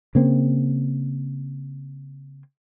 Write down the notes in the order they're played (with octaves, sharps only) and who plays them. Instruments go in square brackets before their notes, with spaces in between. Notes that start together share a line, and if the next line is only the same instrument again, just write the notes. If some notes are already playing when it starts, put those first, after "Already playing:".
[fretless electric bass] C#3 A#3 C4